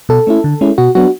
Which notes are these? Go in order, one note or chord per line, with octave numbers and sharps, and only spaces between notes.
B2 A4
A3 C#4 E4
D3
G#3 C#4 E4
B2 F#4
F#3 B3 D4 F#4